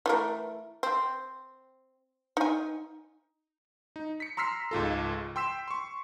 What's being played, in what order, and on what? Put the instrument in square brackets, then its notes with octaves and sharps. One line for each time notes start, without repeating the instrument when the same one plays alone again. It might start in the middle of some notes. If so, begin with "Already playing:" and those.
[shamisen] E3 A3 A#4
C4
D#4 G#5
[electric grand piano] D#4
B6 C#7
A#5 C6 E6 F6 B6 C7
C#2 G#2 F4 A4
G5 C6 E6 B6 E7
C6 C#6